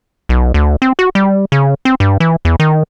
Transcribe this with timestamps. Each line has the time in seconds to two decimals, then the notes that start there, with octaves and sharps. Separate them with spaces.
0.29 B1
0.54 D2
0.82 C4
0.99 F#4
1.15 G3
1.52 C#3
1.85 C4
2.00 G2
2.20 E3
2.45 E2
2.60 D#3